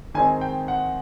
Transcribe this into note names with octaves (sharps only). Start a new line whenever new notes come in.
D#3 G#3 C4 D#4 G#5
G5
F#5